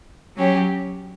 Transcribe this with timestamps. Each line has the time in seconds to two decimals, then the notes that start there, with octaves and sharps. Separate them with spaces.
0.36 F#3 C#4 G4